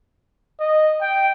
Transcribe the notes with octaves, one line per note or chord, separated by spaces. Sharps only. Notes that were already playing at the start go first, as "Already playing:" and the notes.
D#5
G5